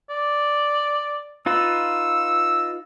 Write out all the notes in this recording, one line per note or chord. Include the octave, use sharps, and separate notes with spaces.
D5
D#4 F4 B4 E6